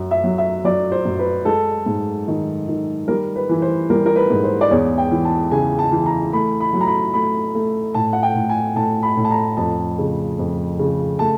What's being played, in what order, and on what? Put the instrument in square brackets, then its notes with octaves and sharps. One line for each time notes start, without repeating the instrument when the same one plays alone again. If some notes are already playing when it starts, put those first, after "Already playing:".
Already playing: [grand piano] F#2
E5
F#3
E5
F#3 D5
C5
F#2
B4
G#3 A4
G#2
D#3
D#3
G3 A#4
B4
E3
C5
G3 A#4
A#4
B4
G#2
C5
D5
E2 C#5
G5
E3
A5
C#3 G#5
A5
E3
A#5
A3 B5
B5
F#3
A#5
B5
A3 B5
A3
A2 A5
F#5
G5
A2
G#5
A2 A5
B5
A2
A5
A#5
F2 A5
C#3
F2
C#3
A3 A5